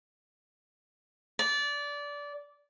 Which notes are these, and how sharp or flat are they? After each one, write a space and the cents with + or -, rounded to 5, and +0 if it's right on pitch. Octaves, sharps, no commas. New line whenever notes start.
D5 -20